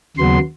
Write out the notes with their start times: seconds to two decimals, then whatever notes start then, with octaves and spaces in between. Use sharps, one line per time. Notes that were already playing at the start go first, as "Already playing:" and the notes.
0.17 D#2 C#3 F#3 B3 C6